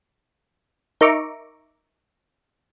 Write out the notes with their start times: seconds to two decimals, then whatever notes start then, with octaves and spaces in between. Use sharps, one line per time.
1.01 D#4 A#4 E5 A#5 C#6 D6